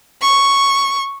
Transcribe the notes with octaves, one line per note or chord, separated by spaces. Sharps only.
C#6